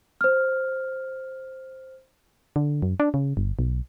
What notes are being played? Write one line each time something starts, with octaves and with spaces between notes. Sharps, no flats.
C5 F6
D3
F#2
D4
C#3
G1
B1